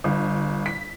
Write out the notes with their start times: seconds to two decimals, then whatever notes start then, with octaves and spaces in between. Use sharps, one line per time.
0.04 G1
0.66 B6